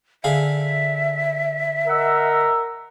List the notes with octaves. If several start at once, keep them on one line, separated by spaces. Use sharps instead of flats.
D3 G#4 E5 F5
A#4 D#5 F#5 E6